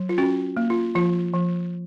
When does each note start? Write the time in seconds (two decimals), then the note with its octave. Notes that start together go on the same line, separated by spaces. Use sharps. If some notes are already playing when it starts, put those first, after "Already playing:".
Already playing: F#3
0.09 F4
0.18 C#4 F#4
0.57 A#3
0.70 F4
0.95 F3 F4
1.33 F3